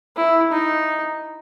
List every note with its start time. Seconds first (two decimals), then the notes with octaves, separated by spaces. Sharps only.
0.17 E4
0.52 D#4